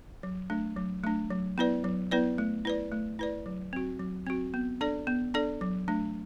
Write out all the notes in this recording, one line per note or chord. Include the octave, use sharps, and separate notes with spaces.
F#3
A3 D4
F#3
A3 D4
F#3
B3 E4 B4 D5
F#3
B3 E4 B4 D5
A3
E4 B4 D5
A3
E4 B4 D5
F#3
C4 F#4
F#3
C4 F#4
B3
D4 A4 D5
B3
D4 A4 D5
F#3
A3 D4